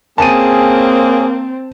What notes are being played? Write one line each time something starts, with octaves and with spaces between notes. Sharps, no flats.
A#3 C4 C#4 G#4 A5 D#7